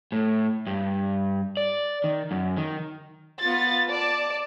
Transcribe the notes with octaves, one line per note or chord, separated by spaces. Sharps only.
A2
G2
D5
D#3
F#2
D#3
B3 F4 A6
D5 A5